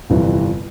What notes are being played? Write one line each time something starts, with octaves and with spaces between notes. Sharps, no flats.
G1 F2 C3 E3 G3